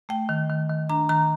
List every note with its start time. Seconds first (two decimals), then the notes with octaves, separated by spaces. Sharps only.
0.09 A3 G5
0.29 D#3
0.50 D#3
0.69 D#3
0.89 D4 A#5
1.09 D#3 A#5